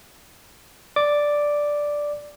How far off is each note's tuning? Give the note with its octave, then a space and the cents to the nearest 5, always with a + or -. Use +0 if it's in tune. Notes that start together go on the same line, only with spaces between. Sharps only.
D5 +0 D6 +0